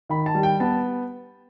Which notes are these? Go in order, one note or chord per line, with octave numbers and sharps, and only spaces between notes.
D#3 B5
A5
G3
G5
B3 A5